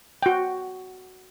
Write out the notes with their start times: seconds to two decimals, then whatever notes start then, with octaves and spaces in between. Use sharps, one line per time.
0.23 F#4 G5